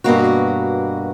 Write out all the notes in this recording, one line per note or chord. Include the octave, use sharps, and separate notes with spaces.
G2 B2 A#3 F#4